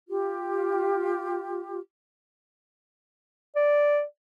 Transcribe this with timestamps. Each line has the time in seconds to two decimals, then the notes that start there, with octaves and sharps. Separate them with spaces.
0.08 F4 G4
3.56 D5